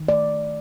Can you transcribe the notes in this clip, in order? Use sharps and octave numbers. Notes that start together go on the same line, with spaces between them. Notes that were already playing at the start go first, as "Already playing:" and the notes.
Already playing: D#3
A3 D5